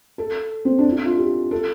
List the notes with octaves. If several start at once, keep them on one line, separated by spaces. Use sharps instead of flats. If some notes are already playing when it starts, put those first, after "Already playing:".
A4
C4
D4
E4
F4
G4
A4